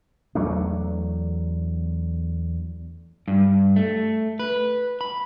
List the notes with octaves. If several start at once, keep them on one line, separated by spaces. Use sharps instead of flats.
E2 F#3 A3 D4
G2
A3
B4
B5